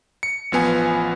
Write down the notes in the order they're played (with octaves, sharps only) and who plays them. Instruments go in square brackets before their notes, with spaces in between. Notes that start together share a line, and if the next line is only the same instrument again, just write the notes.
[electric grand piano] C#7
A1 F3 B3 G#5